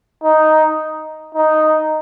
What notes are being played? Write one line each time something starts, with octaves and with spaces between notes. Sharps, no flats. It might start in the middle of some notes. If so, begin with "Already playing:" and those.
D#4
D#4